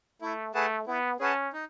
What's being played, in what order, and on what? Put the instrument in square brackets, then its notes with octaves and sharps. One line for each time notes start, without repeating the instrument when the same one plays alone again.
[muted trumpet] A3 [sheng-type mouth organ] E4
[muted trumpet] A3 [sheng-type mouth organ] G#4 B4 F#5 A5
[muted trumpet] B3 [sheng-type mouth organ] E4
[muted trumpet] C#4 [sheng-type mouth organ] G#4 B4 F#5 A5
[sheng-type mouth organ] D#4